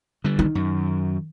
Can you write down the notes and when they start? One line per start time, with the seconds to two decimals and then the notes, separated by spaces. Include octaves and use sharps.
0.24 D3 G3
0.39 D#3
0.55 F#2